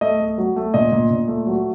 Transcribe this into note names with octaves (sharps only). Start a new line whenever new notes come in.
A3 D#5
A3
F#3
A3
A#2 D#5
A#2
A#2
A3
F#3